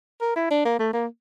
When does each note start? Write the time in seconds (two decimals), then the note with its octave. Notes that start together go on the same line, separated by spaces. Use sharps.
0.21 A#4
0.36 E4
0.51 D4
0.65 A#3
0.79 A3
0.94 A#3